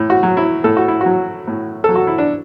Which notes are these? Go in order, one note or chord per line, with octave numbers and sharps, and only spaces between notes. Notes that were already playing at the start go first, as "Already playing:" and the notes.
Already playing: A2
F#4
F#3
E4
A2 A4
F#4
E4
F#4
F#3
A2
F#3 A4
F#4
E4
D4